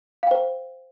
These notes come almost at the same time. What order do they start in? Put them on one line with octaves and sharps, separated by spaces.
F5 G5 C5